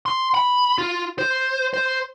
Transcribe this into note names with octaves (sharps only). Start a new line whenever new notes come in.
C6
B5
F4
C5
C5